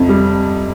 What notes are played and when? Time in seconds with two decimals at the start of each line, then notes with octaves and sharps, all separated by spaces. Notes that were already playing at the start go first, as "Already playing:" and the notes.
Already playing: F2 C3
0.09 G3